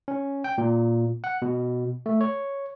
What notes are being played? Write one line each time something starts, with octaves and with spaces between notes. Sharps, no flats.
C#4
G5
A#2
F#5
B2
A3
C#5